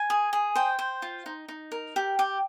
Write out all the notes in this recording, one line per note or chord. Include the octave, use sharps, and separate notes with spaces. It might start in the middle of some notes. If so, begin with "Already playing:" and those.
Already playing: G#5
G#4
G#4
C5 G5
C5
F4
D#4
D#4
A#4
G4
G4